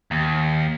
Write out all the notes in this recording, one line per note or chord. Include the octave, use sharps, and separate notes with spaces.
D#2